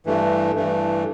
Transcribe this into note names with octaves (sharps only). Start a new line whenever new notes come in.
G2 E3 A3
G2 E3 A3